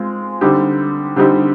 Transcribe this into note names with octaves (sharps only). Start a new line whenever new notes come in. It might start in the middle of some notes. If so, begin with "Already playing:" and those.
Already playing: G#3 C4 F4
D3 G3 C4 D#4 G4
D3 G3 C4 D#4 G4